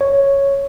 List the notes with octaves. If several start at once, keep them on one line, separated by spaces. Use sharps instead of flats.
C#5